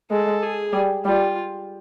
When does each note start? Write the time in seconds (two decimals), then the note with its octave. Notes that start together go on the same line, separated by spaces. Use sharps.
0.11 G#3 A4
0.42 G#4
0.73 G3
1.05 G3 F4